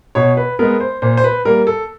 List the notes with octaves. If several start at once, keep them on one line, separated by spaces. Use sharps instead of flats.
B2 C#5
B4
G#3 B3 A#4
C5
A#2 C5
C5
B4
G3 A#3 A#4
A4